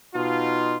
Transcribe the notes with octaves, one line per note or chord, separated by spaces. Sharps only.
B2 D#4 F4